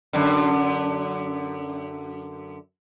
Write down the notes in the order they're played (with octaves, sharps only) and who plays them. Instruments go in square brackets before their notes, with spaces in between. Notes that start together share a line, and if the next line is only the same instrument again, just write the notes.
[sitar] F#2 D3